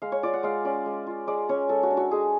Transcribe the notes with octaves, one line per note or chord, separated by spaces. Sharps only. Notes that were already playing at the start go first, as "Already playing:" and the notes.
G#3 F5
C#5
F4 D5
F#5
G#3 F5
C#4 D5
G#3
F4
G#3 D5
C#4 C#5
G#3 A4
F#4
D4
F#4
G#3 G#4